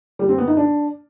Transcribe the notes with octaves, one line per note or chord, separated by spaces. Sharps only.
G3
C4
B3
D#4
D4